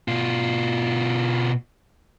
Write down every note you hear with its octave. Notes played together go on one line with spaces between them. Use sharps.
B2 F4